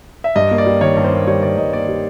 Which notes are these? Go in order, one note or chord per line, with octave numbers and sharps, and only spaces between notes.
E5
G2 D#5
A#3
D5
G3
D#3 C#5
G2
C5
A#3
G3 C#5
D#3 D5
G2 D#5
A#3 D5
G3